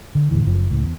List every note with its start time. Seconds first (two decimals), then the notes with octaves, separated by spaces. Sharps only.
0.15 D3
0.31 E2 A2 D3 E3
0.45 F#1 F#2 F3
0.70 C#2 A2
0.83 E2